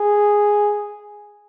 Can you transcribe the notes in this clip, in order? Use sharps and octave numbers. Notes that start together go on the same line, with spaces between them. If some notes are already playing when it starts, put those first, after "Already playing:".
Already playing: G#4